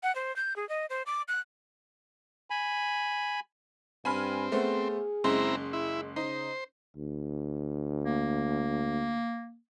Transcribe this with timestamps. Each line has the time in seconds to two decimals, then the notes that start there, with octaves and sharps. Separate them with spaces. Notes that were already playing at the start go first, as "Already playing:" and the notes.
0.03 F#5
0.16 C5
0.36 G6
0.56 G#4
0.69 D#5
0.90 C5
1.06 D6
1.28 F#6
2.50 G#5 B5
4.05 G2 C4 G#5 B5 F6
4.52 A3 B3 G#4 C5
5.24 F#1 G#3 C4 E4 A#5 C6
5.73 E4
6.16 C#3 D#4 C5
6.97 D2
8.04 A#3